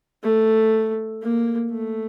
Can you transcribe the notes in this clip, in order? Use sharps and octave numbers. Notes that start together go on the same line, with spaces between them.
A3
A#3
A3